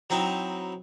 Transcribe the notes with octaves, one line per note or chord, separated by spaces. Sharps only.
F#3 C4 D#4 E4